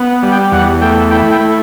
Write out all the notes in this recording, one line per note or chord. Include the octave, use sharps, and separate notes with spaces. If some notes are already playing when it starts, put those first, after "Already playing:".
Already playing: B3
G3
G5
E2 F#5
A3 G5
E4 G5
G5
A3